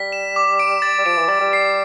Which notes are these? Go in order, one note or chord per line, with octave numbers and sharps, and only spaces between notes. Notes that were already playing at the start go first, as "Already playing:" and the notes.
Already playing: G3 B6
E7
D6
D7
A6
G3
F3 D7
E3
G3 A6
G3
C7